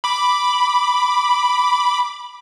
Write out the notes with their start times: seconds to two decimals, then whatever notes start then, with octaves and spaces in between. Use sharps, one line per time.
0.04 B5 D6